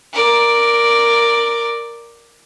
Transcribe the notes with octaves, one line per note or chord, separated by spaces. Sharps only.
A#4 D5